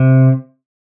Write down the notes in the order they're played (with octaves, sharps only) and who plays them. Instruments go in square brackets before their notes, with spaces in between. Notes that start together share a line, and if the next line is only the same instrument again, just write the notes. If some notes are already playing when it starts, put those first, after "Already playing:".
Already playing: [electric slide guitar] C3